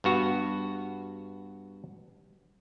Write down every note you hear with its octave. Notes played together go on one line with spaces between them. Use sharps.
G2 B3 F#4